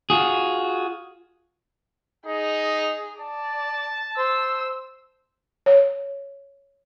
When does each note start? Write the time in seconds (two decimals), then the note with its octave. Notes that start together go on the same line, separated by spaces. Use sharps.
0.10 F4 F#4 G#4
2.26 D#4 G#4
3.19 D5 A5
4.17 C5 E6
5.66 C#5